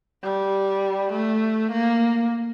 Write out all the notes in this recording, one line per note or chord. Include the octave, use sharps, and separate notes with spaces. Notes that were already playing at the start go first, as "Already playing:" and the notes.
G3
A3
A#3